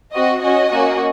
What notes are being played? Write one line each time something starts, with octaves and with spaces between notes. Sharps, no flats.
C4 F#4 D#5
C#4 F#4 D#5
A#3 C#4 F#4